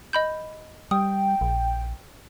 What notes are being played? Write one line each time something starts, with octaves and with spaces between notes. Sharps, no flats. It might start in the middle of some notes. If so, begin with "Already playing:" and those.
D#5 B5 G6
G3 G5 D#6
A#1